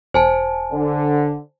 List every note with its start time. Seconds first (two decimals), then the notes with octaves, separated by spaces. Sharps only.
0.14 E1 C5 G#5 A5
0.72 D3